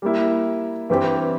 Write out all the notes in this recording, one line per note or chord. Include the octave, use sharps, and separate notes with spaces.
G3 A#3 E4
G2 E3 G3 C4 G4